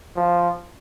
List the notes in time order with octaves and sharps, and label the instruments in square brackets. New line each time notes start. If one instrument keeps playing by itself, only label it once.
[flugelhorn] F3